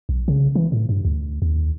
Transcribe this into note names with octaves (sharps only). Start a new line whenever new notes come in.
B1
C#3
E3
A2
G2
D2
D#2